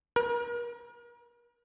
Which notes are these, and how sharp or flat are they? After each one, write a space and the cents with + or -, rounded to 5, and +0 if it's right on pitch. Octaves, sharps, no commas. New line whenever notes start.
A#4 +45